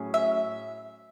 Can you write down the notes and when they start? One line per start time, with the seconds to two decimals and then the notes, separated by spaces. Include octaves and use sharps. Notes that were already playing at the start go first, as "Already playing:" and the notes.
Already playing: A2 F#3 C#4 G#4
0.14 E5